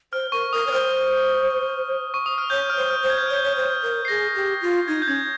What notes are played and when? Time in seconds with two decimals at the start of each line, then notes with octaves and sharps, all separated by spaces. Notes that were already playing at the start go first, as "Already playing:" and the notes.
0.13 C5 F6
0.32 A#4 C#6
0.52 A#4 D#6
0.67 C#5 D#6
0.72 C5 F6
2.14 C#6
2.26 D#6
2.38 F6
2.50 C#5 G6
2.70 F6
2.77 C5
2.90 F6
3.03 C5
3.10 G#6
3.18 G6
3.26 F6
3.30 C#5
3.35 G6
3.43 C#5
3.56 C5
3.83 A#4
4.05 C7
4.08 G#4 A#6
4.35 G4
4.62 F4
4.88 D#4 G#6
5.02 G6
5.07 C#4 G#6